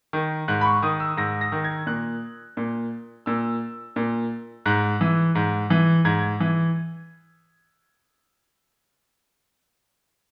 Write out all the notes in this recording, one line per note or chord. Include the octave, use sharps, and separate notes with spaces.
D#3
G#2 F#6
B5
C#6
D#3 D#6
E6
G#2 A#6
A#6
D#3
G#6
A#2 F#6
A#2
A#2 E6
A#2
G#2 F#6
E3
G#2
E3
G#2 G#6
E3